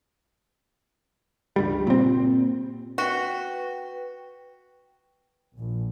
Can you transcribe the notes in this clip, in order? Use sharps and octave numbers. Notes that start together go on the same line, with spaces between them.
C#2 G2 G3
A#2 C4
F#4 B4 G5
A#1